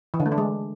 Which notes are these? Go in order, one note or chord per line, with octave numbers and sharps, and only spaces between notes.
E3
D3
A3
D4
G#3